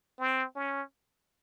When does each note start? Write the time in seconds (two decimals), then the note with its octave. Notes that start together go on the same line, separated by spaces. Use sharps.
0.19 C4
0.56 C#4